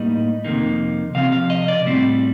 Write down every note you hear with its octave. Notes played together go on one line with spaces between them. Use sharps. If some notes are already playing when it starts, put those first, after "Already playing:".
Already playing: A2 G3 A#3 D#4 D#5
F2 C3 D#3 A#3 D#4
C3 F3 C4 F5
F5
D#5
D5
A2 G3 C4